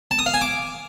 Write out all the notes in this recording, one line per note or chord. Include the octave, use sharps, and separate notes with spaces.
A5
D#6
F5
G#5
D6